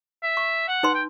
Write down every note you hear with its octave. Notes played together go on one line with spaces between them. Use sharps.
E5
C#6
F#5
D#4 B4 C6
G5